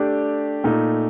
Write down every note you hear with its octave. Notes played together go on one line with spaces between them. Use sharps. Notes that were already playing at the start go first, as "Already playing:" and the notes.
Already playing: A3 D4 G4 D5
A#2 A3 D#4